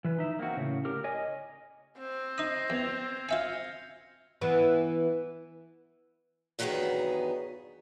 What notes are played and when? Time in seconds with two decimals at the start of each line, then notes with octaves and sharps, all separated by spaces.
0.05 E3 B4
0.19 D#4 E5
0.39 A#3 C4 F#4
0.57 A2 C#3
0.85 G4 A#4
1.04 C#5 D#5 G#5
1.99 C4
2.38 D#4 D#6 A#6 C7
2.70 E2 G6 G#6 F7
3.29 F4 E5 G#5 F6 G#6 C#7
4.41 E3 B3
6.59 E2 G2 D#3 F#3 B3 G#4